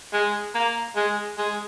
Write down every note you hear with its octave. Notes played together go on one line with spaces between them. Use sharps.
G#3
A#3
G#3
G#3